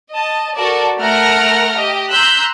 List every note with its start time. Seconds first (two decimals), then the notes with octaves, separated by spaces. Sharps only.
0.12 D#5 A5
0.56 F#4 A4 A#4 D5 A5
1.00 A3 A#4 F#5 A#5 F6 A#6
1.77 G4 D#5
2.11 A#5 C6 E6 F#6 G6 B6